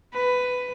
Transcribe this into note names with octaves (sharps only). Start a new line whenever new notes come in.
B4